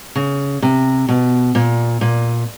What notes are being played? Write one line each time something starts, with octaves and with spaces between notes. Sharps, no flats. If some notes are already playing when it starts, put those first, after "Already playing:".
C#3
C3
B2
A#2
A#2